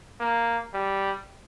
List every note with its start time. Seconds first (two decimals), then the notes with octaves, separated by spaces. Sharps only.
0.20 A#3
0.74 G3